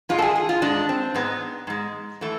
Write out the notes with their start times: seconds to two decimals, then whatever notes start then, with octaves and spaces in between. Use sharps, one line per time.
0.09 G#2 G#3 F4
0.19 A4
0.22 G#4
0.36 G#4
0.49 F4
0.62 G#2 G#3 D4
0.89 C4
1.15 G#2 G#3 B3
1.67 G#2 G#3
2.21 E3 A3